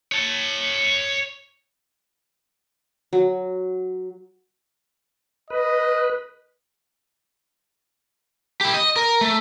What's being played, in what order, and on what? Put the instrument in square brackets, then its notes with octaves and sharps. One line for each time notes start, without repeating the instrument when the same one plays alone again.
[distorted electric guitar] C#5 A5
[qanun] F#3
[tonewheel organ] B4 [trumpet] D#5
[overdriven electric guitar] E4 G4
D#5
A#4
A3